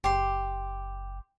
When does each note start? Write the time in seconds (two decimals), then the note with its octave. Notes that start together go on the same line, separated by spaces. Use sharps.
0.04 F#1 G4 C6